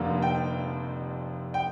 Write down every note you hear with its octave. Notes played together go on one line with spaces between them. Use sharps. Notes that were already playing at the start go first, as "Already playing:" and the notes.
Already playing: F1 F2 D3 G3 A#3
G5
G5